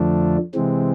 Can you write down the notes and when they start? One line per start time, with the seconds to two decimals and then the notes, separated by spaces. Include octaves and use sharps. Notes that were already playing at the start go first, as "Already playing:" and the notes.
Already playing: F2 D3 F3 A3 D4
0.54 C3 E3 G#3 C4